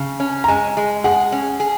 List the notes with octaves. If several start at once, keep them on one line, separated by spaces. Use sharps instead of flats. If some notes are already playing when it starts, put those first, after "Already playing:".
Already playing: C#3
C#4
A#5
G#3 G#5
G#3
G#4 F#5
C#4
G#4